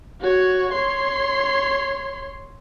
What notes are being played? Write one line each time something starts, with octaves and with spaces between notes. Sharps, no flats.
F#4 C#5
C#5 C6